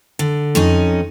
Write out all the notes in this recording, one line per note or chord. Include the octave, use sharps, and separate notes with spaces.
D3
F2 C#4 D#4